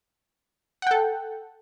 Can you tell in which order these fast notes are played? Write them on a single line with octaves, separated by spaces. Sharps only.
F#5 G5 A4